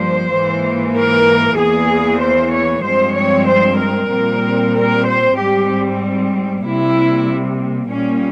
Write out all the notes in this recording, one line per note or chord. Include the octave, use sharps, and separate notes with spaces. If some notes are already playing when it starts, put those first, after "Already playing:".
Already playing: G2 F3 A#3 C5
G#2 E3 A#3
A#4
E2 E3 A#3 G#4
C5
C#5
G2 F3 G#3 C4 C5
C#5
C5
A#4
A#2 G3 C4
A#4
C5
G#2 G3 C4 G4
C3 G3 A#3 E4
A#2 G3 A#3 C#4